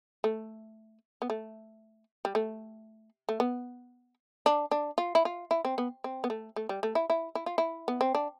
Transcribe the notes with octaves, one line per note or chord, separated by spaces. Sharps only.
A3
B3
A3
G3
A3
A3
B3
D4
D4
F4
E4
F4
E4
C4
B3
C4
B3
A3
A3
G3
A3
E4
E4
E4
F4
E4
B3
C4
D4